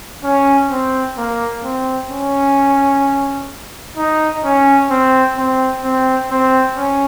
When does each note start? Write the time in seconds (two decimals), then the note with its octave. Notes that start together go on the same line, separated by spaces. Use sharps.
0.24 C#4
0.71 C4
1.17 A#3
1.64 C4
2.11 C#4
3.97 D#4
4.44 C#4
4.90 C4
5.37 C4
5.84 C4
6.31 C4
6.77 C#4